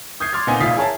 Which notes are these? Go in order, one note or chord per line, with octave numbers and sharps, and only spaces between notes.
D#6 G6 G#6 C7
C6 D6 F6 G#6 A6
A#2 B3 C4 D#4 D#5 G#5
E1 A2 F4 D#6 B6 C7
E4 G#4 A#4 C#5 A5